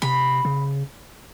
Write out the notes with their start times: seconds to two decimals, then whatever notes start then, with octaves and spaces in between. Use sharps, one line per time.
0.02 C3 B5
0.45 C#3